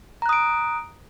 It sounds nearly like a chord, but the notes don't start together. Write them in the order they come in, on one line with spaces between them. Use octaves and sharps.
A#5 F#6 D#6 D7